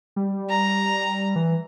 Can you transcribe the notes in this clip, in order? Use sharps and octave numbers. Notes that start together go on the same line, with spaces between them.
G3
A#5
E3